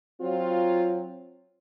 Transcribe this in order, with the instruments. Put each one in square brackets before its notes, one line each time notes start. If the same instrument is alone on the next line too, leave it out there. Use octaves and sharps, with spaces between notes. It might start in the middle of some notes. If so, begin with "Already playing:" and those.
[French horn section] F#3 C4 F4